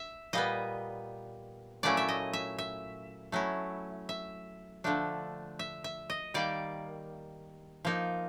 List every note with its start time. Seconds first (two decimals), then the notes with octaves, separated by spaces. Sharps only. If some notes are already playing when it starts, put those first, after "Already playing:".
Already playing: E5
0.33 A#2 G3 B3 D#5
1.83 A#2 F#3 A3 C#4 E4 D5
1.97 E5
2.09 D#5
2.33 E5
2.58 E5
3.32 F#3 A3 C#4 E4
4.09 E5
4.84 D3 F3 A3 D4
5.59 E5
5.84 E5
6.10 D#5
6.34 D#3 G3 A#3 D5
7.85 F3 A#3 D#4